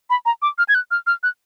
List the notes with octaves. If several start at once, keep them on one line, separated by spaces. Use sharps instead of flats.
B5
A#5
D6
F6
G#6
F#6
F6
F6
F#6